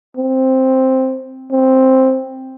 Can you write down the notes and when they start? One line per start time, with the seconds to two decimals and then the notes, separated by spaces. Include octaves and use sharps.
0.17 C4
1.51 C4